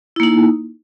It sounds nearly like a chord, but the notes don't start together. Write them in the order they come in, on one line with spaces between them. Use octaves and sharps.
E4 A#3 D#4